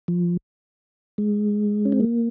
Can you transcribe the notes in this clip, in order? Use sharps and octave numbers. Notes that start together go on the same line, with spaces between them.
F3
G#3
C#4
C4
A#3